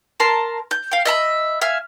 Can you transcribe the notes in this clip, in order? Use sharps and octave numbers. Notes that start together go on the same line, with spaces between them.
A#4 A5 A#5 C6
G6
F5 G5
D#5 E5 A5 B5
E5 F5 G#5 F6